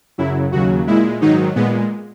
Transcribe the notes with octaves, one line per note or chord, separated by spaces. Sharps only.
F#2 C#3 F#3 E4
D#2 C#3 F#3 F#4
A#2 G#3 E4
G#2 D#3 F#3 D#4
A#2 G#3 B3